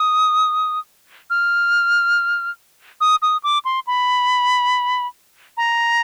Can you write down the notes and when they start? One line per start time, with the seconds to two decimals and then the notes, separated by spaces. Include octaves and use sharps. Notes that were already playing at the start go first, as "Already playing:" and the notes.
Already playing: D#6
1.30 F6
3.01 D#6
3.22 D#6
3.43 D6
3.65 C6
3.87 B5
5.57 A#5